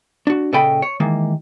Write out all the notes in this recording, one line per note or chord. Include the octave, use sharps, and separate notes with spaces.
D4 F#4
A#2 C#3 A4 D#5 G5 B5
C#5
D#3 E3 G#3 A#3